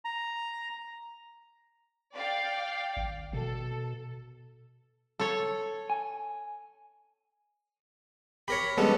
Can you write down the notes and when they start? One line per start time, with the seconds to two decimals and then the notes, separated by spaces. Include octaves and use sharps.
0.05 A#5
2.15 D5 F5 G5
2.97 G#1
3.33 B2 A4
5.20 A4 C#5
5.90 G#5
8.48 G4 A#4 C#5 B5
8.77 D3 G3 G#3 B3 C#4 A4